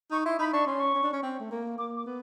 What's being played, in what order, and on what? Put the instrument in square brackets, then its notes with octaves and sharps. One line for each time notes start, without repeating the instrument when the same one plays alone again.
[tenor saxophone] D#4 [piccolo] C#6
[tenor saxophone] E4 [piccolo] C6
[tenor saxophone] D#4 [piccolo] B5
[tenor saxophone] D4 [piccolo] C#6
[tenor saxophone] C#4 [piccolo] C6
[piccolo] C#6
[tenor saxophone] C#4
D4
C#4
C4
A3
A#3
[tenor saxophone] A#3 [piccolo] D6
[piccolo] D6
[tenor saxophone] B3